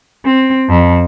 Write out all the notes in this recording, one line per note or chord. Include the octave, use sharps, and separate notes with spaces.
C4
F2